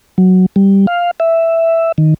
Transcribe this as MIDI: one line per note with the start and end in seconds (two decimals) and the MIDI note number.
0.18 0.46 54
0.56 0.86 55
0.87 1.11 77
1.20 1.92 76
1.98 2.14 51